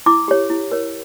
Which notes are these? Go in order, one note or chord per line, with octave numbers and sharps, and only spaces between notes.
E4 D6
G4 C#5
E4
A#4 C#5